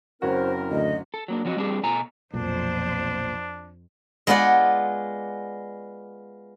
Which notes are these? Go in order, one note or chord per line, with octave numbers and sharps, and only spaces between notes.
F#1 C4 C#4 E4 F#4 A#4 C5
D2 D#5
A4
F#3 A#3 D4
F3 F#3 C4 F#4 C#5 D#5
G3 C4 D4 G4 G#4
B2 A4 G#5 A#5
B1 F2 A#2 D4 C5
G#3 B3 F4 D5 F#5